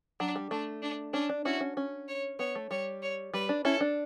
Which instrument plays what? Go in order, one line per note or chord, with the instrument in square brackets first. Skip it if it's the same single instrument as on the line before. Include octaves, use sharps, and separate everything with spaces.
[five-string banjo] F#3 [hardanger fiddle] D4
[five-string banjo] G3
[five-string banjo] A3 [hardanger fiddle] D4
[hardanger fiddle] D4
[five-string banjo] C#4 [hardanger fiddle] D4
[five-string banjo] D4
[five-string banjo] C#4 E4 [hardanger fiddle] F#4
[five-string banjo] C#4
C#4
[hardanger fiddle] C#5
[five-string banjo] B3 [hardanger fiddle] C#5
[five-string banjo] A3
[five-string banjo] G3 [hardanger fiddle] C#5
[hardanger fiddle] C#5
[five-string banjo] G3 [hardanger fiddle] B4
[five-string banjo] D4
[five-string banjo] C#4 E4 [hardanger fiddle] A4
[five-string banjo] D4